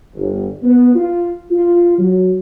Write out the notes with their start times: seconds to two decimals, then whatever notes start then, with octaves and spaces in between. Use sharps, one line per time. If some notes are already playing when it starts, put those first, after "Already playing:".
0.15 G1
0.63 B3
0.95 F4
1.51 F4
1.98 F#3